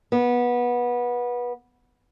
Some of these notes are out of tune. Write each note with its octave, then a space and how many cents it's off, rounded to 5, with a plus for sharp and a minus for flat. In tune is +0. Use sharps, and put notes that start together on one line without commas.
B3 -20